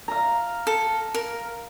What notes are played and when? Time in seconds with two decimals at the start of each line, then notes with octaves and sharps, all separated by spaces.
0.08 F5 A#5
0.67 A4
1.14 A#4